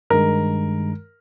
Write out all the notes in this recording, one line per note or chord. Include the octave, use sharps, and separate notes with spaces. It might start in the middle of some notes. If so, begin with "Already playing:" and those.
G2 D#3 G#3 A#4